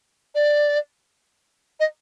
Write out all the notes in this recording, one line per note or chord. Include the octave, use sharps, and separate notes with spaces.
D5
D#5